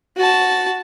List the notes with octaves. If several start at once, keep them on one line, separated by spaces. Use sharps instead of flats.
F#4 A5